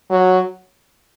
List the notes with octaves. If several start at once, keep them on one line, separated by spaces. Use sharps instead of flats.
F#3